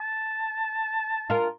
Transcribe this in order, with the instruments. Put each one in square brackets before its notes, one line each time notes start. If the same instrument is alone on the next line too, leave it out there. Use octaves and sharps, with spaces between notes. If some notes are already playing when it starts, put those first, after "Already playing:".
[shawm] A5
[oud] F4 A#4